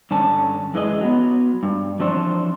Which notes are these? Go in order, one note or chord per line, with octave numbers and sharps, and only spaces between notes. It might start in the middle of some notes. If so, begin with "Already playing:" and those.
G2 D3 C#4 A5
F#2 E3 G#3 D#5
F#3 B3
G2
E3 F3 C4 D4 C5 C#5